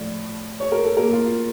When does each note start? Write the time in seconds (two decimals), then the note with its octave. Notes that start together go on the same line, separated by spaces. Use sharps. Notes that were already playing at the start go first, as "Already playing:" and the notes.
Already playing: A2 F3 D5
0.60 C#5
0.72 A#4
0.84 A4
0.97 A#3 A#4
1.13 F4